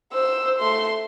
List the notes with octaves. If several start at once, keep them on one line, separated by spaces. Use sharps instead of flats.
C5 E6
A3 C6